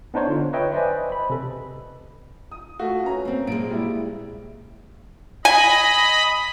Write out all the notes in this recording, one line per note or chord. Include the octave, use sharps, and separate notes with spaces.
B3 D4 D#4 C5 C#5
D3 F4
B4 C#5 D#5 E5 G5
B4 C5 D5 D#5 G#5
B5
C3 A4
D#6
A3 F4 F#4
C#4 B4 A#5
A#3 C4
A#2 G#3 D7
G3 E4
D#5 G#5 B5